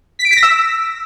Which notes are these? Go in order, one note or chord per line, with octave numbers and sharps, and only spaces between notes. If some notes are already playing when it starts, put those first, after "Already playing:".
B6
D7
B6
A#6
E6